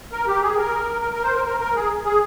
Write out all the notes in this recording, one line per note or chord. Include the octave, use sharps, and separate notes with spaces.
A#4
G4
G#4
A#4
A#4
A#4
C5
A#4
A#4
A#4
G#4
G#4